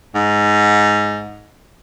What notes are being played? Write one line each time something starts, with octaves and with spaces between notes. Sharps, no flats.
G#2